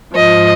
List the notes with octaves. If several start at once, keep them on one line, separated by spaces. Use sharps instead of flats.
G#2 F3 D#5